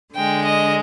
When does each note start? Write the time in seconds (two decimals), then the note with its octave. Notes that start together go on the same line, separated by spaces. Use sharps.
0.15 D3 G#3 G5
0.44 D#5